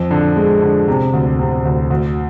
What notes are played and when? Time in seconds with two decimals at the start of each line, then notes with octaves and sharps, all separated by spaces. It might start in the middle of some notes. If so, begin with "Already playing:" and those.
Already playing: F2
0.11 D3
0.36 G#3
0.62 D3
0.88 C3
1.13 D2
1.39 C3
1.65 D2
1.90 D2